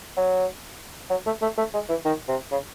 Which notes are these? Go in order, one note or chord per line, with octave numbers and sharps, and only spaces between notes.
F#3
F#3
A3
A3
A3
G#3
E3
D#3
C3
C#3